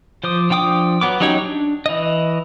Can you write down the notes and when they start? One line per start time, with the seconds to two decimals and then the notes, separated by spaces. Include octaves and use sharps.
0.24 F3 C5 D6 D#6
0.50 F3 D4 G5 D6 D#6
1.01 F#3 B3 D6
1.20 F#3 C#4 D#4 G4 C#5
1.44 D4
1.86 E3 D#5